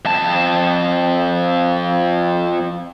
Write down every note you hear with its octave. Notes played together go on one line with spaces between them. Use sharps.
F2 A5